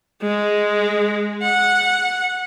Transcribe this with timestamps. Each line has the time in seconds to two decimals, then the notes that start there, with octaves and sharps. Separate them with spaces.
0.22 G#3
1.43 F#5